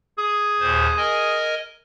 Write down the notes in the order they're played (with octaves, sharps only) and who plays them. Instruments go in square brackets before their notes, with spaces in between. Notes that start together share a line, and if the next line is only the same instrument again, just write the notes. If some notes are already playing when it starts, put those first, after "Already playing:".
[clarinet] G#4
[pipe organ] D#2 A#2 C5
A#4 D#5 G#5